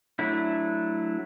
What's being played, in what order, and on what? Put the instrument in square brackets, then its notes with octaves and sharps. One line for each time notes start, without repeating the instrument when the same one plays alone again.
[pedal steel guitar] F#3 A3 D4 E4